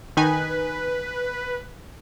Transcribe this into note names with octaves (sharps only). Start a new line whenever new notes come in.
D#3 D#4 B4 G#5